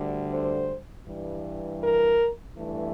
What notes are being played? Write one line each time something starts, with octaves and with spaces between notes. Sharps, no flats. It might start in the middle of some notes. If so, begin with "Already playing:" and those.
Already playing: D2 D3 G3
C5
G2 E3 G3
A#4
G2 E3 A3